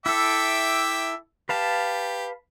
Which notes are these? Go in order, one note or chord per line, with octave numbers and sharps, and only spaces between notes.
E4 A4 E5 G5 D6
G4 B4 F5 A5